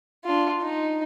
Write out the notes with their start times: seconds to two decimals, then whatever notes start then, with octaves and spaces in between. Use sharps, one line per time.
0.25 D4 F4
0.62 D#4